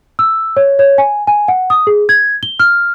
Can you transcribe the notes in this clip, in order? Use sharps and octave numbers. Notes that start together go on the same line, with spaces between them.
E6
C#5
C#5
G#5
G#5
F#5
D#6
G#4
G#6
G7
F6